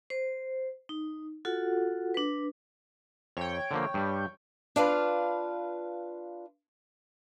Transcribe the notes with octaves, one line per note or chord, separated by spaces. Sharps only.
C5
D#4
F4 F#4 A4 F#5
D4 B4
F2 C#5 G5
D3 F3 A#3
G2 G3
D4 F4 B4 F5